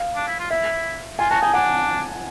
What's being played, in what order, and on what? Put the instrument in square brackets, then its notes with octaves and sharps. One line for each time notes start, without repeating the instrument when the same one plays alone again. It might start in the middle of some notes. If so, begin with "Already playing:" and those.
Already playing: [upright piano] F5
[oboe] D4
E4
F4
[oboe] E4 [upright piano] E5
[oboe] F4 [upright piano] G#5
[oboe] F#4 [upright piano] A5
[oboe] D#4 [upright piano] G#5
[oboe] D4 [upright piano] F#5